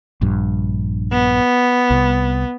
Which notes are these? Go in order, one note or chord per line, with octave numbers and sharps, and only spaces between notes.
A#1 G2
B3
C2